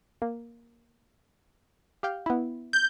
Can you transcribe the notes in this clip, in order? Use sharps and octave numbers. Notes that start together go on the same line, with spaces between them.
A#3
G4 F5 G5
B3 E4
G6